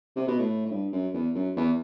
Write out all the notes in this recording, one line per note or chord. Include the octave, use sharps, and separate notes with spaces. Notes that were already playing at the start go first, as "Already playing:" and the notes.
C3
B2
A2
A2
G2
F#2
E2
F#2
E2